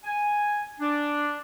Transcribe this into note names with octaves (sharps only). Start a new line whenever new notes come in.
G#5
D4